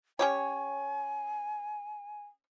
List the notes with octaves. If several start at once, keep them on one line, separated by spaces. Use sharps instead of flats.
C#4 G4 C#5 G#5